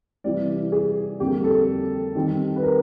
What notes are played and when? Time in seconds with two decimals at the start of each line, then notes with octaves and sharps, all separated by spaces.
0.24 C3 E3 G3 C4 D5
0.72 G#4
1.20 F2 D3 G3 A#3 G4
1.44 A4
2.15 D#3 G3 C4
2.56 B4
2.63 A#4